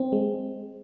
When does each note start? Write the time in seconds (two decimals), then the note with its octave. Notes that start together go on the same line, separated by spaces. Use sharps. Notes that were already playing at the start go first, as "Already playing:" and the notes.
Already playing: C4
0.12 G#3